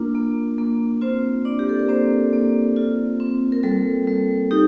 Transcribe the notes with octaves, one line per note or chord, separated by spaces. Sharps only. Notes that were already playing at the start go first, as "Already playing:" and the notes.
Already playing: A#3 D4 F4 A#4
A#3
A#3
C4 F4 C5
D4 D5
G4
A4
A#4
A#3 C4 C5
A#3
F4
C4
A#4
G3 A4
G3
D#4 G4